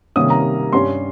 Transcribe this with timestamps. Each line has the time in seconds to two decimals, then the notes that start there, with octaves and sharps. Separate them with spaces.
0.16 C3 D#3 G3 A#3 C#4 D#6
0.30 A#5
0.73 G2 G3 C#4 C6